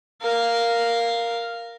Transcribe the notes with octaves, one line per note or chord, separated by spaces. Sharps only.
A#4 F5